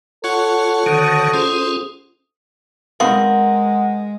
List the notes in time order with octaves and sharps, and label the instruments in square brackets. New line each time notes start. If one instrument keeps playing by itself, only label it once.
[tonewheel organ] F4 [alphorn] A4 [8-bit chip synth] C#5 F#5 C#6
[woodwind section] D2 D#6 [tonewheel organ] D3 D#3
[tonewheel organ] C#4 F4 G#4 [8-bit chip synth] C5
[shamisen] D#3 B3 F5 [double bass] G#3 [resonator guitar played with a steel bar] C4 A#4 [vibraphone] F#5